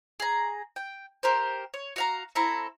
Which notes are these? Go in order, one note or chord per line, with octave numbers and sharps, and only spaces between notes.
G#4 A#5
G5
G4 A#4 C5
C#5
F#4 F5 A#5
C4 E4 A4 A#5